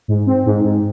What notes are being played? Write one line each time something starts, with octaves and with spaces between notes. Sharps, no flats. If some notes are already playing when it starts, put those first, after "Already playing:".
G#2
C4
G#2
G#2